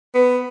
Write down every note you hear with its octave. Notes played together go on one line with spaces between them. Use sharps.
B3